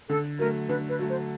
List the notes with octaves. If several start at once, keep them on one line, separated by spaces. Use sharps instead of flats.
D3 A4
F#3 A3 A#4
D3 B4
B4
F#3 A3
C5